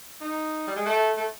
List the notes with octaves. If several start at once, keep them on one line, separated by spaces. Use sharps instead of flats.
D#4
G3
G#3
A3
A3